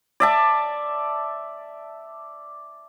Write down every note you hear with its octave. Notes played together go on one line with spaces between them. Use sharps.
D5 E5 A5